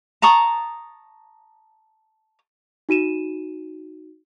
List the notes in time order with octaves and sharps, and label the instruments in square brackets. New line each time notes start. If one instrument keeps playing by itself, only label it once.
[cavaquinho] A5 A#5 C#6 D#6
[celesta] D#4 F#4 D#7 E7